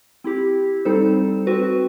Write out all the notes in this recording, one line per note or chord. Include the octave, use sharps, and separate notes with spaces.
C4 E4 G4
G3 C4 D#4 A4 C5
C4 F#4 B4